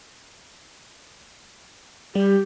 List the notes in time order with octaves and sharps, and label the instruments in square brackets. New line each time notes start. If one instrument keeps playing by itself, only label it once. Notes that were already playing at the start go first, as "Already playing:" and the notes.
[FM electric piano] G3 [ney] G4